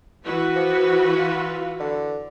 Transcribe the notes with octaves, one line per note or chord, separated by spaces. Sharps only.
E3 F#4 B4
F3
F4
D3